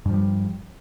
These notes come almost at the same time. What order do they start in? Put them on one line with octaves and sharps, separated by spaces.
G2 F3 G3